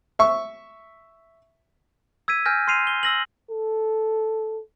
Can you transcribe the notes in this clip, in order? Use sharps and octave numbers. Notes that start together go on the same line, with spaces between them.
E5 C#6
E6 G#6 B6 D#7
G#5 F6 G6 A#6
C6 F6 C7 D#7 F7
G7
E6 A#6 F#7
A4